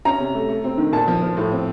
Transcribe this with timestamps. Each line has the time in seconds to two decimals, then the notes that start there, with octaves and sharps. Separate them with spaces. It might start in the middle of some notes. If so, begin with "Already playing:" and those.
0.05 C#4 A#5
0.20 C3
0.35 A3
0.49 A3
0.64 C4
0.78 D#3
0.92 A#2 A5
1.08 F3
1.22 F3
1.37 A2
1.52 C4